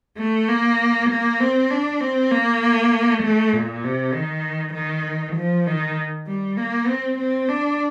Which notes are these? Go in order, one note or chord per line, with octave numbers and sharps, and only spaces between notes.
A3
A#3
A#3
C4
D4
C4
A#3
A3
A#2
C3
D#3
D#3
F3
D#3
G3
A#3
C4
C4
D4